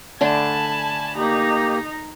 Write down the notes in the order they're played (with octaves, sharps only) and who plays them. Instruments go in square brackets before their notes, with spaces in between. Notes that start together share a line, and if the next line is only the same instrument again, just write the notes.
[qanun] D3 A3 D4 [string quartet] G#5 A5 B5
[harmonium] A#3 G4 [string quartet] D#4 A#5